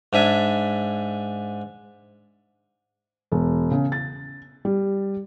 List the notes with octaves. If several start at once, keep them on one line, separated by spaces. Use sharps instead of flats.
G#2 D4 E5 G#5
E1
C#3
A6
G3